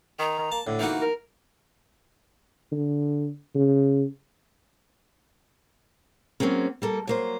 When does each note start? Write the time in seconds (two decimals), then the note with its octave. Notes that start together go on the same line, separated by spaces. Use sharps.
0.19 D#3 A#5
0.39 D#3
0.52 A#3 A5
0.67 A2 D3
0.80 E3 A#3 D#4 F#4
1.02 A#4
2.72 D3
3.55 C#3
6.40 F#3 G#3 A#3 C4 C#4
6.82 G3 A#3 A4
7.07 F#3 A#3 C5